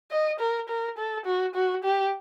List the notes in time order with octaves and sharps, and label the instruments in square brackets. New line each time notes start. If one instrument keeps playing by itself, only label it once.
[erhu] D#5
A#4
A#4
A4
F#4
F#4
G4